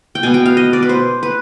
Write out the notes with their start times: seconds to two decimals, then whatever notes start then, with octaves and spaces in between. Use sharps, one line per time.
0.15 G5
0.23 B2 B3 G#5
0.34 G5
0.46 F5
0.57 D#5
0.73 D5
0.83 B4
0.89 C5
1.23 B4